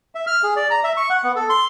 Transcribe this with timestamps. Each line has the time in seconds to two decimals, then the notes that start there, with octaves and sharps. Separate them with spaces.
0.15 E5
0.27 F6
0.43 G#4
0.56 D5
0.71 A#5
0.84 E5
0.97 C#6
1.10 F#5
1.23 B3
1.36 A4
1.50 C6